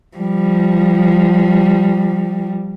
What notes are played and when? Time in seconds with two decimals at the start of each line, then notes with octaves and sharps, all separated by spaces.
0.17 F3 G3